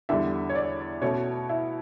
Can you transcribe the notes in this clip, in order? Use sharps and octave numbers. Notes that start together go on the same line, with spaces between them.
E2 D3 G3 E5
C#5
D5
B2 A3 C#4 C#5
E4